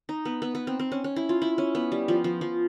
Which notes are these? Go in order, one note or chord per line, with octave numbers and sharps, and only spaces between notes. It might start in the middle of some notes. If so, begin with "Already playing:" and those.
D#4
B3
B3
B3
C4
C4
C#4
C#4
E4
F4
E4
C#4
B3
G3
F3
F3
F3